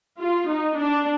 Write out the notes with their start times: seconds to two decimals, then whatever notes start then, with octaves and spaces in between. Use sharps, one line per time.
0.19 F4
0.48 D#4
0.77 D4